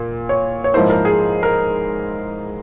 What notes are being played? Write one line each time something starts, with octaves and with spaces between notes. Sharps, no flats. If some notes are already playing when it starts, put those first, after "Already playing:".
Already playing: A#2
C#5
C#5
G#2 F3 A#3 E4 C5
A#4
G#4
A#4